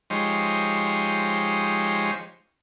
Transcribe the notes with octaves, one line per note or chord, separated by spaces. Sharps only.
F3 G#3 D#4 G4 C5 C#5